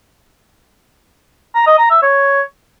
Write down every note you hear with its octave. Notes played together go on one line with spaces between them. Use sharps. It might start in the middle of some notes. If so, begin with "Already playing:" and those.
A#5
D#5
A#5
E5
C#5